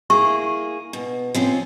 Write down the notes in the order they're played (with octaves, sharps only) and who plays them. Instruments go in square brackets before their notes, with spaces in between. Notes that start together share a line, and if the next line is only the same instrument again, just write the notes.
[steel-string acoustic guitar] A#3 E4 G#4 [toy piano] C#6
[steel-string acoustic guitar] B2
F3 C4 C#4